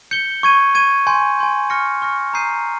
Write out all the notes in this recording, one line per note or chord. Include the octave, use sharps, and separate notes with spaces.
G6 C#7 G7
C#6 G#6 D#7
C#6 G#6 D#7
G#5 C6 G6
G#5 C6 G6
C#6 F6 A#6 C#7
C#6 F6 A#6 C#7
A#5 D#6 G6 C7 D#7